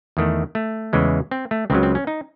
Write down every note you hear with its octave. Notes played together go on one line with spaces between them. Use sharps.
E2 D#3 A3
A3
E2 C#3 E3 G#3
C4
A3
C#2 C#3 F#3 C4
C4
C#4
D#4